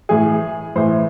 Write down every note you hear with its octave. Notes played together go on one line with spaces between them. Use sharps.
A2 E3 G#4
A2 E3 C5